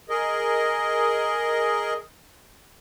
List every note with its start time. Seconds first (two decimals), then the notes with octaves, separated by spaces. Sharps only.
0.09 G#4 A#4 D#5